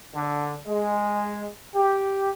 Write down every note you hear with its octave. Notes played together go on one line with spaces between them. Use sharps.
D3
G#3
G4